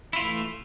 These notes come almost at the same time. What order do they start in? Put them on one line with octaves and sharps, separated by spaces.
E4 F4 E3 A3